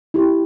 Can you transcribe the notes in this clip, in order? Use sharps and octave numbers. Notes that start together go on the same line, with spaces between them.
E4 G4